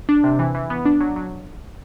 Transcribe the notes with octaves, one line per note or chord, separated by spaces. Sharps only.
D4
C3
E3
E3
B3
D4
F#3
F#3